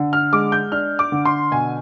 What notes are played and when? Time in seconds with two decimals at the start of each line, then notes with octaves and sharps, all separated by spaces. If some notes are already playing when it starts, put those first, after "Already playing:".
Already playing: D3
0.13 F6
0.33 G#3 D6
0.52 G6
0.72 D4 F6
0.99 D6
1.12 D3
1.25 C6
1.51 B2 G#5